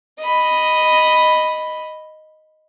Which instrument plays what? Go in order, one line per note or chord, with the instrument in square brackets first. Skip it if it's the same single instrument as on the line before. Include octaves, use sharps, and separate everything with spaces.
[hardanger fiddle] D#5 B5